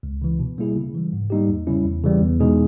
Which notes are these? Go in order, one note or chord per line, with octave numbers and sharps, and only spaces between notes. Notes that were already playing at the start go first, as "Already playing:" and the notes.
C#2
C#3 E3
B2
G3 A#3 E4 G#4
C#3
E3 G3
G#2
G3 A#3 D#4 G4
E2
C#3 G3 C#4 E4
E2
C#3 E3 G3
E2
B2 G#3 D#4 G#4